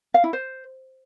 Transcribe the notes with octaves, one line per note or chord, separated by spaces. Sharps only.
F5
E4
C5